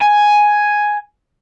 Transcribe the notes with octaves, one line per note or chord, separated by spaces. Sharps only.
G#5